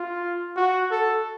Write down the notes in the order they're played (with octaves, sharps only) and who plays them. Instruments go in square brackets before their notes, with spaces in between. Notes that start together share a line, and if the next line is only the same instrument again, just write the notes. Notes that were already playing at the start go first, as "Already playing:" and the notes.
Already playing: [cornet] F4
F#4
A4